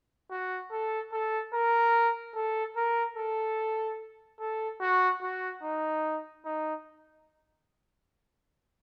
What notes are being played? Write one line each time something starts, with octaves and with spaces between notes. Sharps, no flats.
F#4
A4
A4
A#4
A4
A#4
A4
A4
F#4
F#4
D#4
D#4